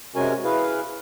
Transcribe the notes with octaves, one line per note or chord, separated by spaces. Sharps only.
C3 G#3 C#4 F#4 A#4 G#5
E4 G#4 B4 F5